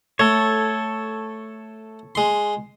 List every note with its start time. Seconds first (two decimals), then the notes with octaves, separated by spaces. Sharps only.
0.19 A3 A4 C#5
2.15 G#3 C6